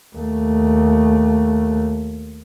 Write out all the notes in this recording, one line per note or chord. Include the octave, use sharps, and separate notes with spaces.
D#2 A3